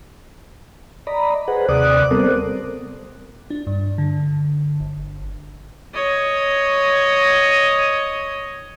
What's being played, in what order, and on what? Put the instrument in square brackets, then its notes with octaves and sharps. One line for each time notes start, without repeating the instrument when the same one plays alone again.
[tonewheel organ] D5 D#5 A#5 B5
G#4 B4 C5 F#5
D#2 C3 D5 D6 D#6 F#6
G3 B3 C4 A4 A#4 C5
[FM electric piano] D4
G2
D3
G1
[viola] C#5 D#5